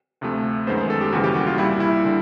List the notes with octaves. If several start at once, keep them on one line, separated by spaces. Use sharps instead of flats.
D2 C3 F3 A3
F#2 D#3 G#3 B3 C5
C5
A4
G4
D#2 C#3 E3 G3 F#4
G4
F#4
F4
C2 A#2 G3 E4
E4
D3 G3